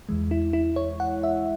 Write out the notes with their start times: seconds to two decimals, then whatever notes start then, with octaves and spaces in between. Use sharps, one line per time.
0.09 E2 E3 G#3
0.31 E4
0.53 E4
0.76 C#5
1.00 F#5
1.23 E5